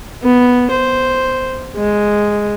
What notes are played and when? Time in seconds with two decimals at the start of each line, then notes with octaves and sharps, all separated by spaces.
0.23 B3
0.71 C5
1.76 G#3